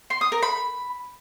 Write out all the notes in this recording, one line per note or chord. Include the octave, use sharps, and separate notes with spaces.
C6
D#6
A#4
B5